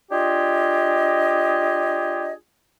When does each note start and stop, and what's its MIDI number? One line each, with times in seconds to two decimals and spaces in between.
0.11 2.34 62
0.11 2.34 65
0.11 2.34 67
0.11 2.34 68
0.11 2.34 75